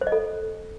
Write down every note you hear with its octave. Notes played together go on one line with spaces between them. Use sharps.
C5
D#5
A4